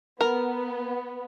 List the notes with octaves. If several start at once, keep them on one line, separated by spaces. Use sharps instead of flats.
B3 A#4